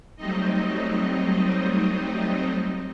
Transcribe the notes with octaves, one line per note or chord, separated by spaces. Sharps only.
F#3 G3 A3 C4 D#4 D#5